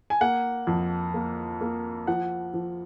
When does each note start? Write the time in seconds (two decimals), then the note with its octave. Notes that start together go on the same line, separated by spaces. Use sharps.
0.10 G#5
0.21 A#3 F#5
0.67 F2
1.14 A#3
1.61 A#3
2.07 F3 F#5
2.54 F3